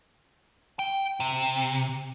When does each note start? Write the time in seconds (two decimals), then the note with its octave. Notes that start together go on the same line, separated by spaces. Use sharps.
0.79 G5
1.20 C3